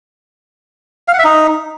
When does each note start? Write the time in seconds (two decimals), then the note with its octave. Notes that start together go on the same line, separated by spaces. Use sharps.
1.08 F5
1.14 F#5
1.19 E5
1.24 D#4